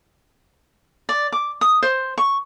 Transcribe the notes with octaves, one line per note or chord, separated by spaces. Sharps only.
D5
D6
D#6
C5
C#6